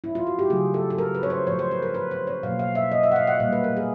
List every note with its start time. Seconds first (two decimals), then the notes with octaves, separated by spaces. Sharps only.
0.04 E4
0.15 F4
0.27 F#4
0.39 G4
0.50 C#3 F#3 A3 G#4
0.74 A4
0.90 A4
0.98 A#4
1.15 B4
1.23 C#5
1.30 C5
1.47 A#2 F3 A3 C#5
1.59 C5
1.71 B4
1.82 A#4
1.94 B4
2.11 C5
2.27 C#5
2.43 B2 F#3 A#3 F5
2.59 F5
2.75 E5
2.92 D#5
3.03 E5
3.12 F#5
3.16 F5
3.27 F#5
3.40 A#2 G3 A#3 F5
3.52 B4
3.64 A#4
3.77 G#4